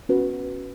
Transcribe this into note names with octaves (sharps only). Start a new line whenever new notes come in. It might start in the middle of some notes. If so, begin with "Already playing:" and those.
C#4 F#4 B4